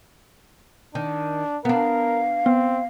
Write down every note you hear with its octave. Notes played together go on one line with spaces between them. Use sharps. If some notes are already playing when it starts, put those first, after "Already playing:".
D#3 D4
B3 D4 A#4 F5
B3 C4